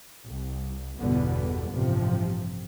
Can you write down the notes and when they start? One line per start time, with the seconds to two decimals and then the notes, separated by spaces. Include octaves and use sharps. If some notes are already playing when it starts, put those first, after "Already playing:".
0.24 C2
0.99 G1 E2 B2 D3 G3 B3
1.70 A1 G2 C3 F3